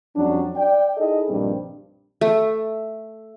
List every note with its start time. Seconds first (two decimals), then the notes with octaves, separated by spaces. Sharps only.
0.16 F2 F#3 G3 C#4 D4
0.56 D5 G5
0.97 D#4 E4 G#4 A4 D#5
1.29 A#1 G2 D#3 G3 C4 D4
2.21 A3